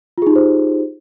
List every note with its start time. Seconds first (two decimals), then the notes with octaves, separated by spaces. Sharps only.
0.18 F4
0.22 G#4
0.27 D#4
0.31 G4
0.36 C5